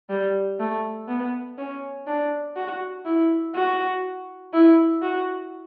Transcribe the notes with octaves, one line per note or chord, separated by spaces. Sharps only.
G3
A3
B3
C#4
D4
F#4
E4
F#4
E4
F#4